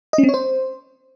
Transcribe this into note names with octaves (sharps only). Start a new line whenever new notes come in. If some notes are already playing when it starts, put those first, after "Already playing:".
D#5
C#4
C4
C#5
C5